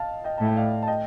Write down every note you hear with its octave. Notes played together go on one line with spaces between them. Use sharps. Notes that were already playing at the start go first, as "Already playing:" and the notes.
Already playing: D#5 F5 A5
D#5 G5
A2 A5
G5
D5 F5
A5
D#5 G5